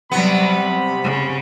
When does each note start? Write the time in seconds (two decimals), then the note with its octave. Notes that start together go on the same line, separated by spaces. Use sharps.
0.12 C3 F#3 G3 B3 B5
1.04 C#3